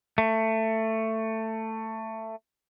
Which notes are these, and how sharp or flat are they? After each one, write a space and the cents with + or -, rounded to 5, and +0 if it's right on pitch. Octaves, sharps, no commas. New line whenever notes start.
A3 +15